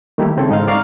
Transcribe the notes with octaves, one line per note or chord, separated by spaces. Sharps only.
D#3 G3 A3 A#3 E4 G4
C#3 C4 E4 A4
G#2 D#4 D#5 F5
D5 F5 A#5 C#6